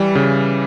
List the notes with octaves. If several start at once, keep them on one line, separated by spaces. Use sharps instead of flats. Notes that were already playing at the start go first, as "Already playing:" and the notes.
Already playing: E3 G3
C#3